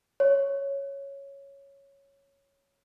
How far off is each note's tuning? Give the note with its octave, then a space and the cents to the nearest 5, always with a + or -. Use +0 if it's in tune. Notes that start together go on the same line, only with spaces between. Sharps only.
C#5 +0